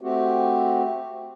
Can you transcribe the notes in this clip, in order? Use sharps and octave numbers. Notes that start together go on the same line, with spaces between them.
A3 C4 F#4 G4